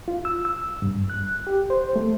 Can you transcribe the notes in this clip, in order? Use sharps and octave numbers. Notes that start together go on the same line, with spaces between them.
F4
E6
E6
G2
F#6
G4
C5
A3